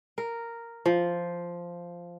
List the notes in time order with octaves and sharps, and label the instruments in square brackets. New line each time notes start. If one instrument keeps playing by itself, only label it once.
[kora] A#4
F3